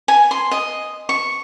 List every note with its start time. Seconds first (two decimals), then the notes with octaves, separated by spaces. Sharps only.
0.08 G#5
0.31 C6
0.51 D#5
1.09 C#6